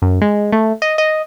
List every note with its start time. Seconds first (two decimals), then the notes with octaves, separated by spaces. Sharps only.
0.02 F#2
0.21 G#3
0.52 A3
0.82 D#5
0.98 D#5